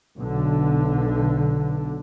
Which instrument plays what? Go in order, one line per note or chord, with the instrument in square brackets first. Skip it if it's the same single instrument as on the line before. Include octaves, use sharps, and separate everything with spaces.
[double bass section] B1 D3